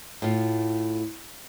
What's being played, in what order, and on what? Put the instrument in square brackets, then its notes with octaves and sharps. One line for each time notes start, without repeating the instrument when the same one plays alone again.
[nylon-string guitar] A2 F4